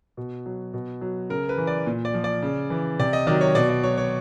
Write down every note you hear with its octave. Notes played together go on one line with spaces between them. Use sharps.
B2
F#3
B2
F#3
C#3 A#4
B4
E3
D5
A#2
D5
F3
D5
C#3
E3
C3 D5
D#5
D#3 F#3 D5
C#5
B2 D5
D5
F#3 C#5
C#5